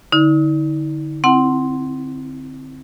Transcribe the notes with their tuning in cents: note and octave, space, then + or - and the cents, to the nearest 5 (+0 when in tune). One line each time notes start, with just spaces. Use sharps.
D3 +0 D#4 +40
C4 +0 E4 +0 F#5 +20